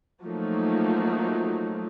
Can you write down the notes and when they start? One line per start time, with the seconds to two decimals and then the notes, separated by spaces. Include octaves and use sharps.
0.23 F3 F#3 A3 A#3 D#4